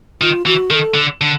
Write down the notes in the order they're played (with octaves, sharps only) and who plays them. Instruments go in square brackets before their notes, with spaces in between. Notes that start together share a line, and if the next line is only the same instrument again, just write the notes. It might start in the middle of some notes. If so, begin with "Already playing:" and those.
[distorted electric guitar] D#3 [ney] F4
[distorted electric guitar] E3 [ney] F#4
[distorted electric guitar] D#3 [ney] A#4
[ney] A4
[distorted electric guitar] D3
D3